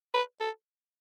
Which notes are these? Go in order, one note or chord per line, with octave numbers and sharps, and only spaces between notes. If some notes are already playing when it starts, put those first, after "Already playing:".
B4
A4